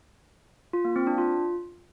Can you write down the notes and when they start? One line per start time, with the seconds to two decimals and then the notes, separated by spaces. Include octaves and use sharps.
0.73 F4
0.85 A#3
0.96 C4
1.07 D4
1.18 F4